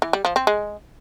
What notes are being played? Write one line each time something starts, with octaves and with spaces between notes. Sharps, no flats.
E3
G3
F3
C4
G#3